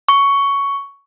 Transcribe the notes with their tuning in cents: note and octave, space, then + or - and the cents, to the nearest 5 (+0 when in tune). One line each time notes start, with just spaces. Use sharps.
C#6 +10